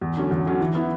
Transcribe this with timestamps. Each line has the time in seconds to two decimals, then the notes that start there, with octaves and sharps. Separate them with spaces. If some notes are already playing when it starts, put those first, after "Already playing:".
0.01 E2
0.17 D3 F#3 C#4
0.31 E2
0.46 D3 F#3 C#4
0.61 E3
0.75 B3 E4